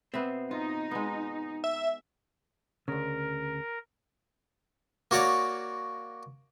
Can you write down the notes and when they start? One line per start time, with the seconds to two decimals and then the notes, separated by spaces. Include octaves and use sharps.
0.14 B2 B3 C4 E5
0.51 D#4 F4
0.91 G#3 B3
1.64 E5
2.88 D2 C#3 A#4
5.11 A#3 F#4 C#5 D5 A#5